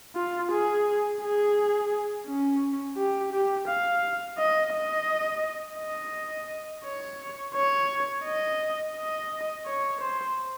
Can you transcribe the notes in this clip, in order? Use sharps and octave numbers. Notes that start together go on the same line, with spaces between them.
F4
G#4
G#4
C#4
G4
G4
F5
D#5
D#5
D#5
C#5
C#5
D#5
D#5
C#5
C5